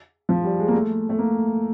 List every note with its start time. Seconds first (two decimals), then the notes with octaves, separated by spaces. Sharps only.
0.29 F3
0.44 G3
0.59 G#3
0.68 A#3
0.74 A3
1.09 A3
1.18 A#3